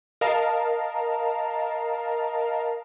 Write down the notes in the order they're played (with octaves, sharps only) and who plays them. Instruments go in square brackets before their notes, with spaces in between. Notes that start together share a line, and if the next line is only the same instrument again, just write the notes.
[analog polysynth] A#4 D#5 F5 A5 A#5